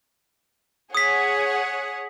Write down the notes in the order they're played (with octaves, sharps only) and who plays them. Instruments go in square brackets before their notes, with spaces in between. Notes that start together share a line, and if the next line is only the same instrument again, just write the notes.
[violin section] G#4 C#5 F#5 [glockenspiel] D#6 B6